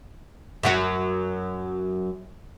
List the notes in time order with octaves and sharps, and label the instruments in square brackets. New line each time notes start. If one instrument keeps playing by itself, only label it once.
[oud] F#2 F#3 F#4